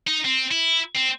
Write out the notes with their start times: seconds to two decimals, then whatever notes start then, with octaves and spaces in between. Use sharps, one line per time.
0.08 D#4
0.25 C4
0.52 E4
0.97 C4